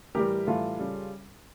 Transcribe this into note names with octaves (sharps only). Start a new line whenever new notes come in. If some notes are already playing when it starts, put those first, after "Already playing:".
A2 E3 G3 G4 A#4
A2 E3 G3 F4 A4
C#3 G3